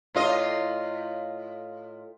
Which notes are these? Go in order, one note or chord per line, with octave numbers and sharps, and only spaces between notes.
A2 F4 D#5